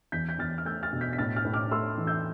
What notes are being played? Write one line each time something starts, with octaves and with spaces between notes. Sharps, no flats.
E2 G6 B6
G6
E2 F6 A6
F6
A3 E6 G6
F6 A6
B2
G6 B6
B6
A2 F6 A6
F6 A6
A2
D6 F6
A3 C6 E6
E3
E6 G6